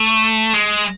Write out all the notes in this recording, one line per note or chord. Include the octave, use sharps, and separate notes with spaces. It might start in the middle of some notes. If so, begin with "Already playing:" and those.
Already playing: A3
G#3